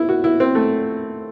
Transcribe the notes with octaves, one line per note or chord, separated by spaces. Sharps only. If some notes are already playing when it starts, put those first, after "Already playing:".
Already playing: E4
F#4
E4
C4
A3